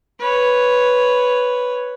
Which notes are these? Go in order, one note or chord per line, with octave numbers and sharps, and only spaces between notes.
B4 C#5